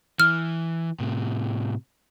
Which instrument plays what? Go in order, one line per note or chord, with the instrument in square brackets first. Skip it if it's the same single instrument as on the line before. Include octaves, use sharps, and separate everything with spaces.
[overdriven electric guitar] E3 [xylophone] F6
[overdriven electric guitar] A2 C3